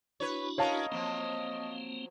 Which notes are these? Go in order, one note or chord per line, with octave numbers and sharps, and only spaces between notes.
D4 E4 F#4 B4 C#5
B3 C#4 A#4 C#5 D#5 F5 A5
F3 F#3 A#3 C4